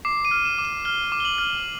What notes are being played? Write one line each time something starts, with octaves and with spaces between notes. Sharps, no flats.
D6 C7
D#7
F6
E7
D6
E7
F6 G7
D6
G7
F#7
F6